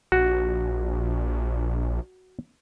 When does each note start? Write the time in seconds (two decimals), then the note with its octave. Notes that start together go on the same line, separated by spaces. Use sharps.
0.12 A#1 F#4